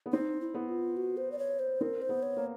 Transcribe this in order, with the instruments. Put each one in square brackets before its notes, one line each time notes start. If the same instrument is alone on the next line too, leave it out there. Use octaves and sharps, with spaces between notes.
[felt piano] B3
[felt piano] C4 [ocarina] D#4
[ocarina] E4
[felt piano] B3
[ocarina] F4
F#4
C5
D5
C#5
C5
[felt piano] C4 [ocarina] A#4
[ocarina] C5
[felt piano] B3
[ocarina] C#5
[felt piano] A#3